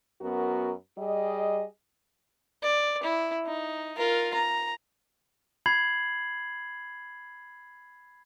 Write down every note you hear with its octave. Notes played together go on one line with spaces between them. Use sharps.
F#2 B3 F#4 A#4
G3 G#4 D#5
D5
E4
D#4
F4 A#4
A#5
B5 G#6 C7 F#7